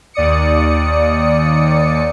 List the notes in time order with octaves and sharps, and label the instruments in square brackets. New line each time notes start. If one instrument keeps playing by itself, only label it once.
[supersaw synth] D#2 D5 D#6 C#7